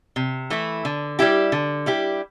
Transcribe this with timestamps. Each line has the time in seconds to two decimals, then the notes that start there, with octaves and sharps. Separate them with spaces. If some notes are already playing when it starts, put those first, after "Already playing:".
0.16 C3
0.50 E3 A3 E4
0.85 D3
1.19 G3 E4 G4
1.52 D3
1.86 G3 E4 G4